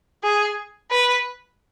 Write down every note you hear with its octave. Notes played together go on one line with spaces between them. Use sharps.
G#4
B4